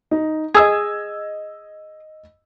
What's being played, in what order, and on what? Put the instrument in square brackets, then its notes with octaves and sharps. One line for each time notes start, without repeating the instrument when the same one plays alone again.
[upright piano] D#4
[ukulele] G#4 [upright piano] D#5 E6 G#6